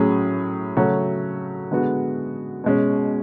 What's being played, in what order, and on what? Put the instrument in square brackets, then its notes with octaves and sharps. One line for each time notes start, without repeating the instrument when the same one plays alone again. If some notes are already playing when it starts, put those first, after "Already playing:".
Already playing: [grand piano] A2 F#3 C#4 G#4
C#3 F#3 A3 C#4 F#4
D3 G#3 B3 F#4
B2 G#3 C#4